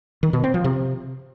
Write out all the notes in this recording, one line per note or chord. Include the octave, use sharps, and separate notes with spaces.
D#3
B2
C4
F3
C3